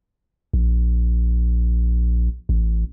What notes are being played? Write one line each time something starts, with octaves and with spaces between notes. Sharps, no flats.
A#1
A1